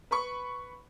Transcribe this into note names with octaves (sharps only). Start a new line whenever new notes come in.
B4 B5 C#6